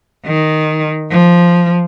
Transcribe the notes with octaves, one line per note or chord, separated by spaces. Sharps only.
D#3
F3